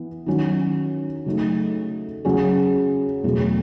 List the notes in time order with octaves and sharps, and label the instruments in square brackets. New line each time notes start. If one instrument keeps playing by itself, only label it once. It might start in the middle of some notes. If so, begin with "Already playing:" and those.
Already playing: [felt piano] E3 B3
D#3 F#3 C#4
C#3 F#3 A3 D#4
C#3 F#3 C#4 G#4
E2 B2 F#3 A3